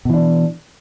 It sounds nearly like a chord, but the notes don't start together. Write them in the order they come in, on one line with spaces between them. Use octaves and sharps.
B2 E3 D4